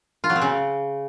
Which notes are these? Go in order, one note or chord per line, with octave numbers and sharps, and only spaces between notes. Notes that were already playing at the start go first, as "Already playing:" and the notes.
F4
F#3
C4
C#3